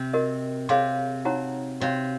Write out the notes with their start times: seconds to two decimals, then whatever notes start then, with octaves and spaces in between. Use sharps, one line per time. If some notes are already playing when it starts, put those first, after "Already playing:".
Already playing: C3
0.13 F#4 A#4 D#5
0.69 C3 G#4 C#5 F5 C6
1.25 D#4 F#4 C#5 F#5 A#5
1.81 C3 F#4 C#5 F5